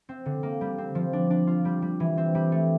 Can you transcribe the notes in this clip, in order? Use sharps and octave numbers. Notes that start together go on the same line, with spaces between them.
C4
D3
A#3
G3
C4
F3
D4
D4
F4
G3
G3
E3
C4
G3
A3